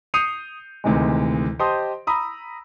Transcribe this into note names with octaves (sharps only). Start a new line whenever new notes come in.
D#6 G6 C7 C#7 D#7 F7
D2 C3 D#3 E3 G#3
G4 C5 D#5 A5 C6 D#6
A#5 B5 D#6 E6